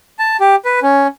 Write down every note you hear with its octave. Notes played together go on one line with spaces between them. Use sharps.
A5
G4
B4
C#4